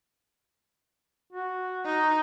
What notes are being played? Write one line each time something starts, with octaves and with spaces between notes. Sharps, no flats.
F#4
D#4